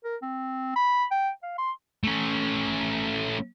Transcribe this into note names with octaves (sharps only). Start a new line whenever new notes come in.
A#4
C4
B5
G5
F5
C6
A3 C#4